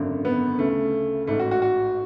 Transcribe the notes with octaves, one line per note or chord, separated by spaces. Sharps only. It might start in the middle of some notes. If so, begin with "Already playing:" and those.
Already playing: G#1 F#2 D3
B3
D2 C#3 A3
A1 G#2 A3
F#4
F#4
F#4